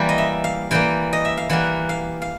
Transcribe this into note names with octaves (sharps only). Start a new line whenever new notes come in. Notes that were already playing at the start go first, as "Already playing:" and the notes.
Already playing: E3 G3 A#3
D#5
E5
F5
E3 G3 A#3 G5
D#5
E5
F5
E3 G3 A#3 F#5
F5
F5